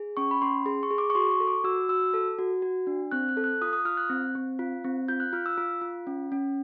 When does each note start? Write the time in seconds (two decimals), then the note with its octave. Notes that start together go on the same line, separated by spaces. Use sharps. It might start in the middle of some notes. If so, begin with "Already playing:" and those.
Already playing: G#4
0.17 C#4 C#6
0.31 B5
0.42 C#4 C6
0.66 G#4 C6
0.83 C#6
0.90 G#4
0.98 D6
1.10 C#6
1.15 F#4 C6
1.31 C#6
1.40 A4
1.47 D6
1.64 F#4 E6
1.89 F#4 E6
2.14 A4
2.39 F#4
2.62 F#4
2.87 D4
3.11 C4 F#6
3.29 F#6
3.37 A4
3.44 F#6
3.62 F4 D#6
3.73 D#6
3.85 F4 F6
3.97 F#6
4.09 C4
4.35 C4
4.59 F4
4.84 C4
5.08 F4 G6
5.20 F#6
5.33 F4 F6
5.46 E6
5.58 F4
5.81 F4
6.07 C#4
6.32 C#4